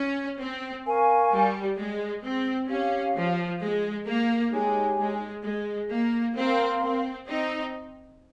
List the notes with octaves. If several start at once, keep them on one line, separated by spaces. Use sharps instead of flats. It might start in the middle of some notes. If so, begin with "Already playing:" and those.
Already playing: C#4
C4
A#4 F5 G#5 C#6
G3
G#3
C4
C#4 G4 C#5 F5
F3
G#3
A#3
G#3 D#4 G4 C#5 G#5
G#3
G#3
A#3
C4 A#4 F5 C6
C4
C4 D#4